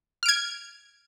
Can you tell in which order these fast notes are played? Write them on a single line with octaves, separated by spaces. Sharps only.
F6 D7 G#6